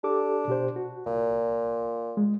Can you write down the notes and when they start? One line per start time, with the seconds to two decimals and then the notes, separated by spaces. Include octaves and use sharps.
0.04 D4 G4 A4 D6
0.48 B2 G4 C5
0.76 F#4
1.06 C2 A#2
2.17 G#3